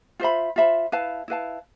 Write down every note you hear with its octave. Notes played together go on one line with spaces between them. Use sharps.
F4 C5 E5 B5
F4 C5 E5 B5
E4 B4 F5 A5
E4 B4 F5 A5